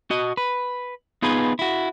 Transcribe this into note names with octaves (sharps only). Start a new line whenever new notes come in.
F#4 D#5
B4
B3 D#4 F4 G#4 B4
E4 F#4